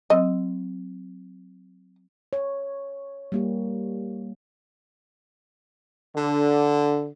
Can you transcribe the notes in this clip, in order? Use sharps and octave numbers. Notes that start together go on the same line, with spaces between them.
F#3 C4 D#5 E6
C#5
G3 A#3 G4
D3